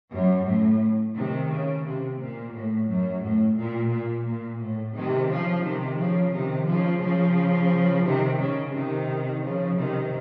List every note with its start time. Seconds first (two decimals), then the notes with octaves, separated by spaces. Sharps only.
0.11 F#2
0.45 A2
1.14 C3 D#3
1.49 C#3
1.84 C3
2.18 A#2
2.52 A2
2.87 F#2
3.21 A2
3.56 A#2
3.90 A#2
4.25 A#2
4.59 A2
4.93 C3 D#3
5.28 C#3 F3
5.62 C3 D#3
5.97 C#3 F3
6.31 C3 D#3
6.66 C#3 F3
7.00 C#3 F3
8.04 C3 D#3
8.38 C#3
8.72 C3 D#3
9.41 C#3 F3
9.76 C3 D#3